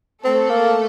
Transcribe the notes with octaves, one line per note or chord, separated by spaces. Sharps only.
A3 C4 A4
A#3